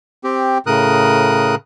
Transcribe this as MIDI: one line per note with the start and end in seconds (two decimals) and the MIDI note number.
0.24 0.58 60
0.24 0.58 67
0.66 1.55 45
0.66 1.55 49
0.66 1.55 70
0.66 1.55 87
0.66 1.55 90